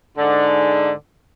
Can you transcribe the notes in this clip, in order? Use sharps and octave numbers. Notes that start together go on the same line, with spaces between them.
G#2 D3